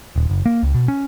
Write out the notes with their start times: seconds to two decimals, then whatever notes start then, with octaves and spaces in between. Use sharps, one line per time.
0.16 D#1
0.29 F#1
0.46 A#3
0.62 C#2
0.74 B2
0.88 C#4